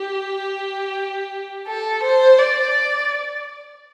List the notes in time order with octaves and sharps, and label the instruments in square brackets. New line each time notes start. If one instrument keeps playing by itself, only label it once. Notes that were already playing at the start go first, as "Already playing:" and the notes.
Already playing: [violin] G4
A4
C5
D5